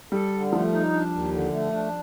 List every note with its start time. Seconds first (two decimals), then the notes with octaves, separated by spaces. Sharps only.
0.12 G3 A4
0.33 D3
0.52 F3 A3
0.73 D#4
0.93 D4
1.12 D#2
1.32 D3
1.52 A3
1.73 D4